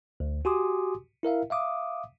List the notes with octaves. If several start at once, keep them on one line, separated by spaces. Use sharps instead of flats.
D2
F#4 G4 G#5 C6 D6 D#6
E4 A#4 E5 F5
E5 F5 D6 D#6